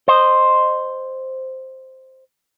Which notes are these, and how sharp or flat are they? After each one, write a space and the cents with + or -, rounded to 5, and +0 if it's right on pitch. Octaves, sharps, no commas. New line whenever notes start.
C5 +0 D#5 -15